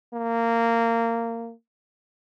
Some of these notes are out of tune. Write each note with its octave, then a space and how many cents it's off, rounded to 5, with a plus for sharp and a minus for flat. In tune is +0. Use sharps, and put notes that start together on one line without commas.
A#3 -15